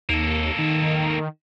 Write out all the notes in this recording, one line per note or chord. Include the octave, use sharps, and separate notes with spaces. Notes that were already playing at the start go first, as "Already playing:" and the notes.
D#2 A#3 A4
D#3